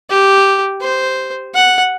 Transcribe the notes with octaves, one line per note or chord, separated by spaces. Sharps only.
G4
C5
F#5